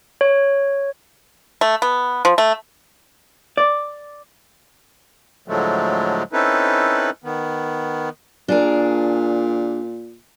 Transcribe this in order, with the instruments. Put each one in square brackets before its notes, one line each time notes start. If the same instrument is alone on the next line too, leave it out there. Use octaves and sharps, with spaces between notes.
[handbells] C#5
[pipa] A3
B3
F3
A3
[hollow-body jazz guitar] D5
[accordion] A2 D3 F3 F#3 G#3 A3
C4 C#4 D#4 E4 A4 B4
D#3 B3
[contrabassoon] A#2 [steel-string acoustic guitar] D4 G#4 A#4